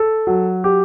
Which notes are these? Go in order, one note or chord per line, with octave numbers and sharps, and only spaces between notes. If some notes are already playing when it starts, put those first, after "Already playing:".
Already playing: A4
F#3
G4